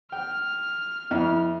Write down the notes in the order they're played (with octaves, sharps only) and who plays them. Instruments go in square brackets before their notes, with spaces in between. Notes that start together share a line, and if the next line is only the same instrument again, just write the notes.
[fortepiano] G5 [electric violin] F6
[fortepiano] F2 [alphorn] E4